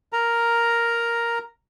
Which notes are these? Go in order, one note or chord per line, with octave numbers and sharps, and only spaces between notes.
A#4 A#5